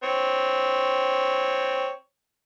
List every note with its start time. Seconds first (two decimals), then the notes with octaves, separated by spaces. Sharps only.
0.04 C4 C#5